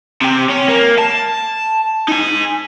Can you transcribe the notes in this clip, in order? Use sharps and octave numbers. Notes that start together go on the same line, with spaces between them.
C3 G4
C#4
A#3
A5
D#4 G#5